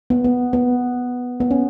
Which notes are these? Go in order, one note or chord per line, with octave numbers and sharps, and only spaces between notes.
B3
B3
B3
B3
C#4